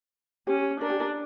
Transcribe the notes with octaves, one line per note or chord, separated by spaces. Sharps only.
C#4 G4
D4 A#4
G4
A#4